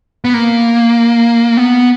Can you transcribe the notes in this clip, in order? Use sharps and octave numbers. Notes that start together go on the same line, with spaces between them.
B3
A#3
B3